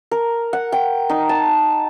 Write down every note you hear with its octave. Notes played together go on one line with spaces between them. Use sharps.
A#4
F#5
G5
D#4
A5